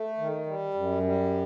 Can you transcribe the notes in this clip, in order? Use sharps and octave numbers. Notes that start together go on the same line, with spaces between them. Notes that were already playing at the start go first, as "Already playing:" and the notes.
Already playing: A3
D#3
G3
F#2
G3